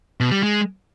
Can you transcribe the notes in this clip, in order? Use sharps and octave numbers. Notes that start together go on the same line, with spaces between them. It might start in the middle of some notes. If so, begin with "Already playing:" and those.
B2
G3
G#3